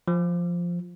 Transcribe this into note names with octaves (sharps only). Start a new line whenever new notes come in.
F3